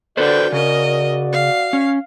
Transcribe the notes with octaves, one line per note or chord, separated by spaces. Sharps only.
D3 F#4 A4 B4 C5 D5 G5
C#3 A#4 D#5
F5
C#4